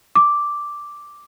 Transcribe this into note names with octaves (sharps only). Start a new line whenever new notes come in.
D6